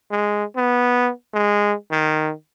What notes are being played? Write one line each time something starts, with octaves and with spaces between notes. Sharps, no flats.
G#3
B3
G#3
D#3